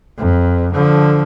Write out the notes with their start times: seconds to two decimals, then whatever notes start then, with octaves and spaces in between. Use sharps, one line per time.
0.18 F2
0.73 D3 F3